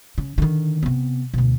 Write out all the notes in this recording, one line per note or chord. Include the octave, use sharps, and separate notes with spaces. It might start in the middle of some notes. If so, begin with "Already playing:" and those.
C#3
D3 D#3
C3 B3
D2 B2